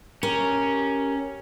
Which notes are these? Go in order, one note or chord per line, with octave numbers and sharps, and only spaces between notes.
C#4 G4 A#4